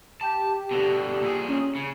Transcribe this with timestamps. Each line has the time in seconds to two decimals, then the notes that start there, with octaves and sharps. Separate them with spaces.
0.21 G4 A5
0.71 B2 D3
1.21 A#2 G#4
1.48 C#4
1.75 C#3